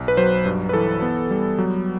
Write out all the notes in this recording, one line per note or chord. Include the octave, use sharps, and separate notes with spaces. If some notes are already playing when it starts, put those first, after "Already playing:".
Already playing: B1
B4
F#3 C5
G2
B4
E3 A4
B3
G3
F#3